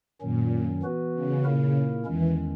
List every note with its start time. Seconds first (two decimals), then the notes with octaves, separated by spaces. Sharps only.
0.21 F#2 A#2 D#3 F#3 C#4
0.83 E3 B3 F#4 B4
1.14 C#3
1.45 A#2 A#3 E4 A#4
2.05 E2 D#3 E3 G#3 C#4